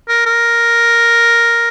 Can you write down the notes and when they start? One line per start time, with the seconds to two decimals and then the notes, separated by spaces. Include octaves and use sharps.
0.09 A#4
0.26 A#4